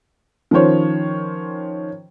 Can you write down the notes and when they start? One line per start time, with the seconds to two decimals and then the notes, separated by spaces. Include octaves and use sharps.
0.51 D#3 F3 C#4 C5 C#5